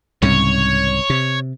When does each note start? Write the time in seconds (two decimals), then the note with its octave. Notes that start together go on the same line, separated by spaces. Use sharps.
0.22 C2 G#2 C#3 C#5
1.10 C3